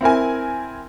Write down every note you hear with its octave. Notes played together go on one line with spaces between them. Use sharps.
C4 E4 A#4 G#5